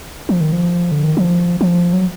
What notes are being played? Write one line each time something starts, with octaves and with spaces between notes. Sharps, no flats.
F3
D#3
F3
D3
D#3
F3
F3
F#3